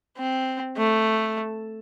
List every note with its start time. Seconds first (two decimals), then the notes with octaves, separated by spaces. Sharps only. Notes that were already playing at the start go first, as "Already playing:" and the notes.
0.18 C4
0.77 A3